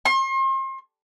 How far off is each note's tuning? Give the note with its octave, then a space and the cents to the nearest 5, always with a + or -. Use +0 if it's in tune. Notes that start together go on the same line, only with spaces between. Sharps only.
C6 +40